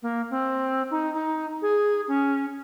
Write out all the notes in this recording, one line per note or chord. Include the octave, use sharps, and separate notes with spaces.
A#3
C4
D#4
D#4
G#4
C#4